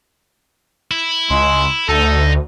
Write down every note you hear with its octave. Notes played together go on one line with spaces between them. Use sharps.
E4
C#2 G#3
D2 D#4 A4